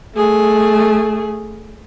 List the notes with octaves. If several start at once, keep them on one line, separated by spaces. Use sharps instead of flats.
A3 G#4